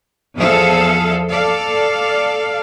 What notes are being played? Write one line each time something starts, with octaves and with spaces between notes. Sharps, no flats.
E2 F3 G#4 A4 E5 F5
A4 D5 F5